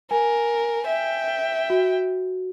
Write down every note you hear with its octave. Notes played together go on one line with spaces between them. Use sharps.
A#4 G#5
E5 G5
F#4